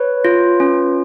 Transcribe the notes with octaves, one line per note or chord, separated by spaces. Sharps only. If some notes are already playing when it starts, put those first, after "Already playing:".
Already playing: B4 C#5
F4
C#4